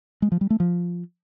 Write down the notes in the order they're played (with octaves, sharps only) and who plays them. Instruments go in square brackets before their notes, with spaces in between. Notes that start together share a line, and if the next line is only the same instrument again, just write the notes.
[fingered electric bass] G#3
F3
G3
A3
F3